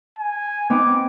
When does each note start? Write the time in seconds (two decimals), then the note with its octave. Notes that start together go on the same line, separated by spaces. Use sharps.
0.19 G#5
0.70 B3 C4 D#4 D6